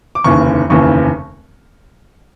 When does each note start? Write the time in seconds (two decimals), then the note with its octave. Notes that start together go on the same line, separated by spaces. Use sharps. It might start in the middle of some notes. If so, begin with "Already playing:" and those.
0.15 D6
0.24 F1 D#2 C#3 E3 C#6
0.70 F1 D#2 C#3 E3 C#6